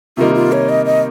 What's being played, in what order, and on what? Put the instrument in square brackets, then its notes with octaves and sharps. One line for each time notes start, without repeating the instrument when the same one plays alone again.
[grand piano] C3 D#3 G3 A#3 D#4 [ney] F4
[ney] F4
C#5
D#5
D#5